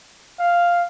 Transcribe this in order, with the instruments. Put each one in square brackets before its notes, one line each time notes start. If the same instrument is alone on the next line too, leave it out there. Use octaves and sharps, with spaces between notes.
[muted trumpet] F5